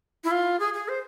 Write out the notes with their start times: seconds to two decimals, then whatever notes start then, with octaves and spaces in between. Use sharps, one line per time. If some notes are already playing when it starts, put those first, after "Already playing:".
0.24 E4
0.31 F4
0.60 G#4
0.74 G#4
0.89 C5